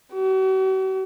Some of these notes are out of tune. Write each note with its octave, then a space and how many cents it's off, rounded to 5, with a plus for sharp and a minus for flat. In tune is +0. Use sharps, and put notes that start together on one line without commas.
F#4 +45